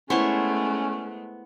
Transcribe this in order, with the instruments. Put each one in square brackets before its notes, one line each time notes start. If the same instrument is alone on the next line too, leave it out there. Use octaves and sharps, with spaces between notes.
[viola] G#3 A3 [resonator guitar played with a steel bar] B3 [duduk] C#4 [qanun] E4 C5 C#5